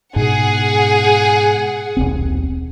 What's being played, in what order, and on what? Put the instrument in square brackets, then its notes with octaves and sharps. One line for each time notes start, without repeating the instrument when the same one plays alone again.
[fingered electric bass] G#2 B2 [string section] G#4 F#5
[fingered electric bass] D#1 B1 C4